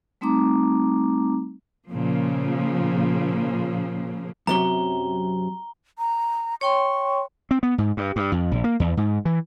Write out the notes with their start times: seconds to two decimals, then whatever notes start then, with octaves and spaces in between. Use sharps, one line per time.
0.21 G3 A3 C4 D#4 A#5 D6
1.90 A#2 C#3 F3
4.47 F#2 C3 F#3 A#5 G7
5.99 A#5
6.61 C#5 G5 C6 C#6
7.51 C4
7.63 B3
7.78 G#2
7.97 G2
8.16 G2
8.32 F2
8.51 A#1
8.64 A#3
8.80 E2
8.97 G#2
9.25 E3